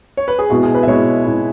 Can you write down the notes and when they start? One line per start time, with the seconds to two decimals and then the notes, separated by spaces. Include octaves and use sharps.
0.17 C#5
0.28 B4
0.39 G#4
0.49 B2 G#3 E4 F#4
0.63 G#4
0.75 B4
0.83 E5
0.87 B2 G#3 E4 C#5
1.24 B2 G#3 E4